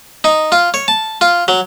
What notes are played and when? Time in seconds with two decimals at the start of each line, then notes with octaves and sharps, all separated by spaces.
0.24 D#4
0.52 F4
0.74 C#5
0.88 A5
1.21 F4
1.48 F#3